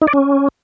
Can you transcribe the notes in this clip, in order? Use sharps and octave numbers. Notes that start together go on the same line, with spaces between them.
D#4
D5
C#4